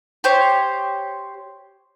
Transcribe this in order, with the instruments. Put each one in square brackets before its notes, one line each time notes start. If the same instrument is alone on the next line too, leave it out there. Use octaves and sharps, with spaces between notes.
[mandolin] G4 C5 C#5